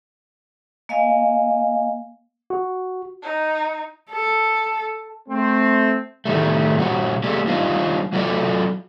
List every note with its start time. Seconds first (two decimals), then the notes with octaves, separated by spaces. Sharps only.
0.89 A#3 D#5 F5 G#5
2.50 F#4
3.23 D#4
4.11 A4
5.29 A3 C4
6.25 A2 D#3 G3 A3
6.77 A#2 G3 F#4
7.24 G#3 A#3 G4 A4 D5
7.47 G3 D4 D#4 F4
8.13 F#3 F4 F#4 A4 D5